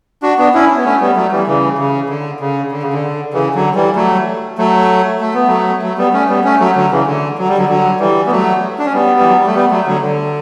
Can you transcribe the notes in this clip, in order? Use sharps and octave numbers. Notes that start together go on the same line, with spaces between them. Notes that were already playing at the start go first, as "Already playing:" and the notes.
D4 F#4
B3 D4
C#4 E4
B3
A3 C#4
G3 B3
F#3 A3
E3 G3
C#3 E3
C#3
D3
C#3
D3
C#3
D3
C#3 E3
D3 F#3
E3 G3
F#3 A3
F#3 A3
A3
B3
F#3 A3
F#3 A3
G3 B3
A3 C#4
G3 B3
A3 C#4
F#3 A3
D3 F#3
C#3 E3
D3
F#3
G3
D3 F#3
D3 F#3
E3 G3
B3
F#3 A3
D4
C#4
G3 B3
E3
F#3
G3
A3
G3 B3
F#3 A3
D3 F#3
D3